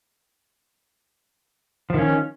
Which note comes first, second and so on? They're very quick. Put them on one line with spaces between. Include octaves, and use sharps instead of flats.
F3 D#3 C#4